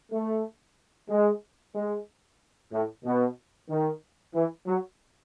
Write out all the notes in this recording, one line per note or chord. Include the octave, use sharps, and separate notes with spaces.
A3
G#3
G#3
A2
B2
D#3
E3
F#3